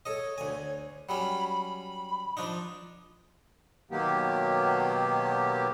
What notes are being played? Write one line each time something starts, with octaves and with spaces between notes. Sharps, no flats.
A4 C#5 D#5
D2 G#5
F#3 G3 C#4 B5
B5
F3 D4 D#4
B2 D#3 F#3 A#3 B3 G4